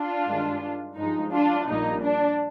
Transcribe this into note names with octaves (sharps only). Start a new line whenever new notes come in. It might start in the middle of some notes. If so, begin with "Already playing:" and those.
Already playing: D4 F4
G2 D#3 G#3
G2 F3 G#3 D#4
D4 F4
A#1 A#2 G3 A#3 D#4
D4